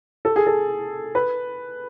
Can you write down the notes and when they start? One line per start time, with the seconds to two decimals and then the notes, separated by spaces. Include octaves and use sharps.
0.25 A4
0.36 G#4
0.47 A4
1.15 B4